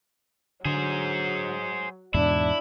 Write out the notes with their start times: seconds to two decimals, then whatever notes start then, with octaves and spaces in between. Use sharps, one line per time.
0.65 D3 F#3 G#4 C5
2.14 E2 G#2 B2 D4 E4